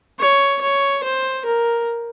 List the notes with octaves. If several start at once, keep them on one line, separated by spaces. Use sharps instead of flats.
C#5
C#5
C5
A#4